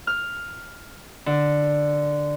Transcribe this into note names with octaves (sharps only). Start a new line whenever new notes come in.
F6
D3